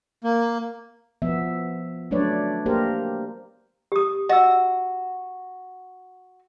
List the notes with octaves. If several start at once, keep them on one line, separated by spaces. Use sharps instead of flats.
A#3
F3 B3 E5
F#3 A3 D4 B4 C#5 D5
A#3 G4 A#4 C5
G4 D#6
F#4 D#5 E6